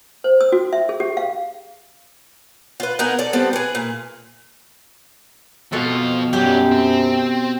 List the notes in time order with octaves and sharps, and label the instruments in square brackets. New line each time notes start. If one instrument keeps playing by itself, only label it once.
[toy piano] C5
E6
F#4
E5
G#4
G4
F5
[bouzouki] F4 B4
B3 D#4 G#4 A#4
A4 D5
G3 B3 C4 A4
G#4 B4
A#2
[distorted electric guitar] F2 F4 [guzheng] B2 A4
[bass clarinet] F#2 [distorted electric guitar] F#3 G3 [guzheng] G4
[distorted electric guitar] C4